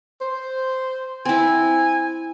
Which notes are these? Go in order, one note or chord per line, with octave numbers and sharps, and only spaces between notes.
C5
C4 E4 G#5